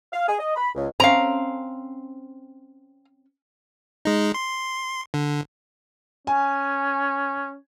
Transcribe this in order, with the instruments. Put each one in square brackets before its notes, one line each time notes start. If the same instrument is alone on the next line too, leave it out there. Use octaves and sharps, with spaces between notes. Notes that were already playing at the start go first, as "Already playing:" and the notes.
[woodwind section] F5
G#4
D#5
B5
C#2
[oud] C4 C#4 [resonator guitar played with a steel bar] F5 A#5
[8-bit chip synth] G#3 D#4
C6
D3
[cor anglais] C#4 [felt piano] G#5